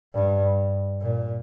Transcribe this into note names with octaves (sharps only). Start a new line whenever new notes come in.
G2
A#2